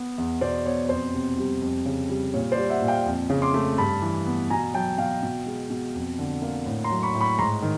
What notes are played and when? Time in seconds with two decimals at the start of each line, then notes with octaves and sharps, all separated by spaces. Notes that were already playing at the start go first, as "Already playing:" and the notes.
Already playing: B3
0.18 E2
0.41 B2 C5 D5
0.65 B3 C#5
0.89 F2 C5
1.14 C3
1.38 G3
1.62 F2
1.86 C#3
2.10 G3
2.34 A#2 C#5
2.52 C5 D5
2.57 G3
2.70 E5 F#5
2.82 A#2
2.88 F5 G5
3.06 F2
3.30 C#3
3.42 C6 D6
3.54 A3
3.78 G2 A5 B5
4.02 E3
4.26 B3
4.50 B2 G#5 A#5
4.74 F#3 G5 A5
4.98 B2 F5 G5
5.23 B2
5.46 G#3
5.70 B2
5.94 F2
6.19 D3
6.42 A#3
6.66 A2
6.84 A#5 C6
6.90 F#3
7.03 B5 C#6
7.15 A2
7.21 B5 C#6
7.39 G#2 A#5 C6
7.62 D#3